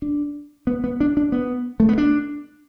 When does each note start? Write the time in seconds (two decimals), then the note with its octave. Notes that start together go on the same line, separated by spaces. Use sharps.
0.02 D4
0.67 B3
0.84 B3
1.00 D4
1.17 D4
1.32 B3
1.80 A3
1.89 B3
1.98 D4